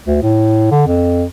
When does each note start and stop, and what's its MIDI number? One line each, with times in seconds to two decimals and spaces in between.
0.07 0.18 38
0.22 0.66 45
0.71 0.86 50
0.87 1.24 41